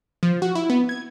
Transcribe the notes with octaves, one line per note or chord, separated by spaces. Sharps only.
F3
F#4
E4
B3
G#6